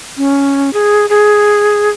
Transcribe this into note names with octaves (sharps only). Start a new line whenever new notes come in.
C#4
G#4
G#4